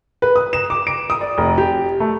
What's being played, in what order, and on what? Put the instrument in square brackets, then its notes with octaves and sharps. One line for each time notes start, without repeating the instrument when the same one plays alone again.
[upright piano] B4
D#6
E7
D6
D7
D#6
D5
F1
G4
A3